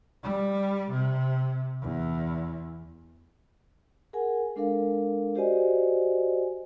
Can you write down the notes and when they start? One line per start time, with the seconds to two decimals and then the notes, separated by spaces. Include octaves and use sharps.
0.23 G3
0.91 C3
1.81 E2
4.13 G#4 A#4 F#5 G#5
4.56 G#3 D4 A4 A#4 F5
5.35 F#4 G4 C5 D5 D#5 G#5